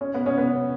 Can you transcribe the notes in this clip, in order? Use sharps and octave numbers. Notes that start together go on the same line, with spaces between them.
C#4
B3
C#4
B3